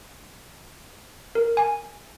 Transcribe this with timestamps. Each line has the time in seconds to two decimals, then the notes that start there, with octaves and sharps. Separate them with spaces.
1.35 A#4
1.57 G#5